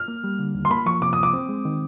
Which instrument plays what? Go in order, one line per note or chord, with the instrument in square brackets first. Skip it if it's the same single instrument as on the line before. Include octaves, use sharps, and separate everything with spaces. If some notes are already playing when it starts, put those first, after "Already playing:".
Already playing: [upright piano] F6
[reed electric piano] A#3
G3
D3
D#2
[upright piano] C6
[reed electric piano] A#3 [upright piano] B5
[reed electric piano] F3 [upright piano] C#6
[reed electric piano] C3 [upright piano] D6
[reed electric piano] C2 [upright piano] D#6
[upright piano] D6
[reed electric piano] C4
G#3
D#3